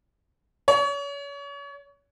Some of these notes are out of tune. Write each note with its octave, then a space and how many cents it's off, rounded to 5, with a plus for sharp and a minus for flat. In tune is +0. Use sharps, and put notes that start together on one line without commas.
C#5 +35